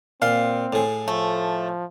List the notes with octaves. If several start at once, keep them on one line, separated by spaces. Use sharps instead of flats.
A#2 C4 F5 C6
A2 G#4
F3 A3